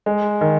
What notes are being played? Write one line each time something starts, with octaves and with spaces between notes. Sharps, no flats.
G#3
D#3